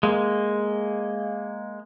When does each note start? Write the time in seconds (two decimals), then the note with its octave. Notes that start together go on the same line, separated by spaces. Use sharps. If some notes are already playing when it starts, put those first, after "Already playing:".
0.03 G#3 A#3